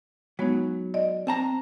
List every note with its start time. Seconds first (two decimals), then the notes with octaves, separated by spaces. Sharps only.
0.39 F#3 G#3 B3 D#4
0.94 D5 D#5
1.27 C4 A5 A#5